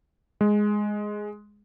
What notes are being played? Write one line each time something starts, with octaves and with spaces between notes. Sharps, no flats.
G#3